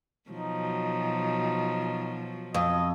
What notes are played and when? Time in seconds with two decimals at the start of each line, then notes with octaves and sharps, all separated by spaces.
0.30 B2 F3 F#3 D#4
2.55 F2 D#5